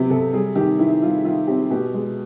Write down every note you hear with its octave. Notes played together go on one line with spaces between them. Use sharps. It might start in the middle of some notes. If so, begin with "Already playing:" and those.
Already playing: C3 F#3 B3 F4 G4
C3 A4
G3 G#4
D#3 G4
D#3 E4
G3 F4
D#3 F4
C4 G4
B2 G4
G#3